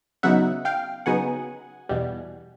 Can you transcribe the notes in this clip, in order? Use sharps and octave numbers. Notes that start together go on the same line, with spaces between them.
C#3 F#3 B3 D#4 E5 F#5
F5 G5
C#3 F#3 B3 D#4 F#5 G#5
E2 B2 G3